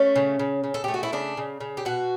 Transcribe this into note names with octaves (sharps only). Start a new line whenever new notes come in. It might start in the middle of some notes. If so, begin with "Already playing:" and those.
Already playing: A3 C#4
C#3
C#3
C#3
A4
A3 G4
F#4
E4
C#3 D4
C#3
C#3
G4
B2 F#4